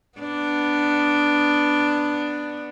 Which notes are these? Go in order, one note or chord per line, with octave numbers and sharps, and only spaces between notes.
B3 D4